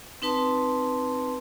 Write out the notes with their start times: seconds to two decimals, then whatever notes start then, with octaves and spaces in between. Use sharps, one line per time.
0.22 C4 D#4 B4 A5 C6